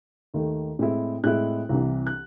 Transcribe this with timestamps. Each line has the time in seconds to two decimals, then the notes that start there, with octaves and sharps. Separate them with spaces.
0.34 D#2 D#3 A3
0.79 A2 G#3 C4 E4
1.24 A2 G#3 C4 E4 F#6
1.69 C2 C3 E3
2.07 F#6